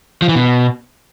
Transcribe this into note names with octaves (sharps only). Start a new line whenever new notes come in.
F3
E3
B2